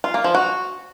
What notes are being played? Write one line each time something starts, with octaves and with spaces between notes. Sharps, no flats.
F4
A#3
F3
F#4